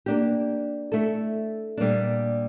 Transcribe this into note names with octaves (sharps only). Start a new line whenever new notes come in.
A#3 D4 G4
A3 E4 A4
A#2 G3 A#3 D4